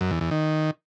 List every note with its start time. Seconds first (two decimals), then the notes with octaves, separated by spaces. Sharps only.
0.01 F#2
0.11 E2
0.21 E2
0.31 D#3